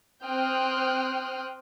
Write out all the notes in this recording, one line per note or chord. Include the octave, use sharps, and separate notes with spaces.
C4 G5 C6 D#6 F6 F#6